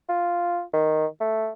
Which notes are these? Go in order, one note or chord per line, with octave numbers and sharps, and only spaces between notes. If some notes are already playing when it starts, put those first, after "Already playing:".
F4
D#3
A3